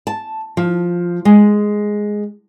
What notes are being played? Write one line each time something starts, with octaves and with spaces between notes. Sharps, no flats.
A5
F3
G#3